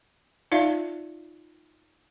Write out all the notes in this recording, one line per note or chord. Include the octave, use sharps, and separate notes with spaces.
D#4 F4 D5 E5 F5